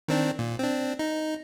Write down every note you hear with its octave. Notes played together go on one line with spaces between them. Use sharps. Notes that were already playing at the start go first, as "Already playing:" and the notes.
D#3 C4 D4
A#2
C4 D4
D#4